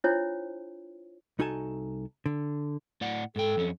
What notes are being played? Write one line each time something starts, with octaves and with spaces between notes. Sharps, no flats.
D4 E4 F4 C5 C#5
C2 D#4 F#4 A4 G#5 A5
D3
A2 D5 F#5
G#2 A4 G5
F2 C#4